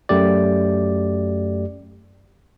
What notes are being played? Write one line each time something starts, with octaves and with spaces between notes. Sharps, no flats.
F#2 A3 G4 D5